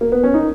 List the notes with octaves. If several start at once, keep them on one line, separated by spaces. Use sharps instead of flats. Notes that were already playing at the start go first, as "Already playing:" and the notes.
A#3
B3
C#4
D#4